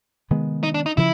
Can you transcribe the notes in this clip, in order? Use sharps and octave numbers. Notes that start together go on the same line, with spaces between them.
C3 D#3 G#3 B3
D#4
D4
D#4
C#3 F3 E4